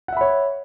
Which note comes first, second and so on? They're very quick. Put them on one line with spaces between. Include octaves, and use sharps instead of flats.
F#5 E5 B5 C#5